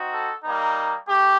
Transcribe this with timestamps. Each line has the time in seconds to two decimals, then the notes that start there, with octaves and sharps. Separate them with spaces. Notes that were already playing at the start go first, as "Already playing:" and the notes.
Already playing: C4 D#4 F#4
0.12 A4
0.44 G3 A#3 D#4
1.08 A3 G4